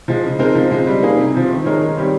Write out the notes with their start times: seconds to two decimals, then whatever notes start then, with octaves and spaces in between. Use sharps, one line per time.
0.08 F3 G#3
0.24 C#3
0.39 G#3 C4 D#4 A#4
0.55 F3
0.71 G#3 C4
0.87 G3
1.03 A#3 D#4 G#4
1.18 C3
1.34 F3 C4
1.50 D#3
1.65 G#3 D#4 A#4 C#5
1.81 D#3
1.97 G3 C4 G4 C#5